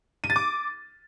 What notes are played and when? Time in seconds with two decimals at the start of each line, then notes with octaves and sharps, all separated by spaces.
0.24 D#7
0.30 A6
0.36 D6